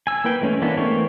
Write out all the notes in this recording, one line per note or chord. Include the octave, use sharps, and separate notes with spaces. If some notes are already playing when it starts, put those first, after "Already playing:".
G#5 E6
A#3 E4 B4 G5
E3 G#3 A3 C#4
E3 G#3 A#3 B3 D4
E3 A3 A#3 C4 C#5